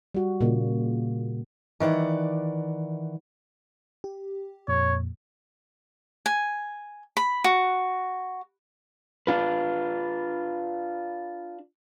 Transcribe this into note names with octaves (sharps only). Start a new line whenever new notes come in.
G3 F#4
A#2 C#3 A#3
D#3 E3 D5 F#5
G4
F2 A#2 C#5
G#5
B5
F#4
D4 F4 B4